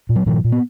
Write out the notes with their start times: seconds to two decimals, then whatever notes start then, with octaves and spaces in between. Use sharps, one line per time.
0.09 A#2
0.16 F#3
0.26 A#2 D#3 F3
0.44 A#2
0.52 B3